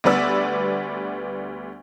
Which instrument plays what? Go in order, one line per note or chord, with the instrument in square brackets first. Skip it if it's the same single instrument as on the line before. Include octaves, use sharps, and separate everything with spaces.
[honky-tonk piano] D2 G3 B3 B4 D5 E6